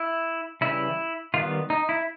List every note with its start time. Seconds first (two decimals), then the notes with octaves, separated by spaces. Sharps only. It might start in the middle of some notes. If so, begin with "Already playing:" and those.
Already playing: E4
0.61 C#3 E3 G3 E4
1.34 D#3 G3 B3 F4
1.70 D#4
1.89 E4